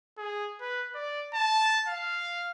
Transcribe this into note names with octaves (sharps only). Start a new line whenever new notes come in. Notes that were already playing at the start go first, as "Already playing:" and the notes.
G#4
B4
D5
A5
F5